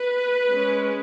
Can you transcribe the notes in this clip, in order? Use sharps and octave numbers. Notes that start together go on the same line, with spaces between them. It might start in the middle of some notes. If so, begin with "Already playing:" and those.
Already playing: B4
G#3 C#4